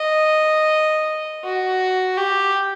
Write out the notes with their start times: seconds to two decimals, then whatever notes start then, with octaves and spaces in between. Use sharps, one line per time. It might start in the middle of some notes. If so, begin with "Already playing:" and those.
Already playing: D#5
1.45 F#4
2.17 G4